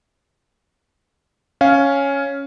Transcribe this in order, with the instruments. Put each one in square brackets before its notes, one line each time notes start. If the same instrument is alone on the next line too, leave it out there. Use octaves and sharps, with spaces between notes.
[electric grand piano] C#4 F5